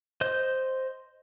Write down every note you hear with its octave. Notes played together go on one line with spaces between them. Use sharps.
C5 D#5 G6